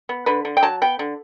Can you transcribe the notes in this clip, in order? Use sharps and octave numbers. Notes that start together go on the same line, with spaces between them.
B3
D3 B4
D3
G5
F#3 A5
B3 G5
D3